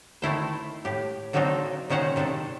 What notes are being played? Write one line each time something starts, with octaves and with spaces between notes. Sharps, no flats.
D#3 A3 E4 C5
A2 G4
D#3 F#3 A#3 C4 D4 D#4
A#2 D#3 C#4 C5 F#5 A#5
C3 D#3 D4 A4